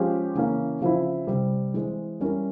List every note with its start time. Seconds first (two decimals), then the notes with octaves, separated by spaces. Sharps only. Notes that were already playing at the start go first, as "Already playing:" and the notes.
Already playing: F3 G#3 C#4 G4 C5
0.35 C#3 E3 A#3 C#4
0.81 C#3 F3 C4 E4
1.27 C3 G3 C4
1.74 E3 G#3 C4
2.20 G3 C#4 E4 A#4